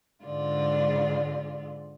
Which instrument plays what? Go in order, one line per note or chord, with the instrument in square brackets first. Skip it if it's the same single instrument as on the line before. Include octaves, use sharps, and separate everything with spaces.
[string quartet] G#2 D3 G#3 F4 D5